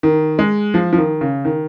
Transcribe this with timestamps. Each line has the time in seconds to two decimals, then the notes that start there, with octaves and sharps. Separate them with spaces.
0.03 D#3
0.39 G#3
0.74 F3
0.93 F3
0.98 D#3
1.21 C#3
1.45 D#3